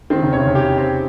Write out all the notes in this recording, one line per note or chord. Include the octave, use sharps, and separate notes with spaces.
D#3 C4
C#3
C3 C#5
C#3
G4
C4